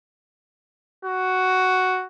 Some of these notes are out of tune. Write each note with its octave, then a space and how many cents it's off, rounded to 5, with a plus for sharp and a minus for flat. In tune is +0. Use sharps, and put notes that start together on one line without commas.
F#4 +5